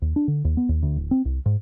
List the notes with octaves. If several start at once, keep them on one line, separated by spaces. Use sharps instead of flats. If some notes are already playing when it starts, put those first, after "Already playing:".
D#2
D4
D3
D#2
B3
D#2
D2
D1
C4
C2
G#2